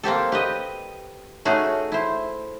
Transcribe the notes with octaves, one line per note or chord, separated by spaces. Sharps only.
A#3 C4 G4 A4
G4 B4 D#5
A3 C#4 D#4 F#4 G#4
E4 C5